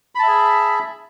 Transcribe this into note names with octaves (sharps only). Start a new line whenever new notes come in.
G#4 E5 A5 B5